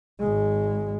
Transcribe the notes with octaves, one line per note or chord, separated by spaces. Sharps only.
G#1 G#3